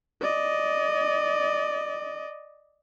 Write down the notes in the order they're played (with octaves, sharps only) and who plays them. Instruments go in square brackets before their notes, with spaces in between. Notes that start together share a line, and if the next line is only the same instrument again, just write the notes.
[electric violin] D5 D#5